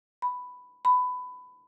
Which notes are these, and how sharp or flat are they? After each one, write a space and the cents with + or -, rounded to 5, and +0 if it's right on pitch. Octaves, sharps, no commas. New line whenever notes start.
B5 +5
B5 +20